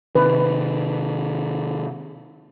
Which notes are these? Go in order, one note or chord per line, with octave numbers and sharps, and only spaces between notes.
C3 D#3 B4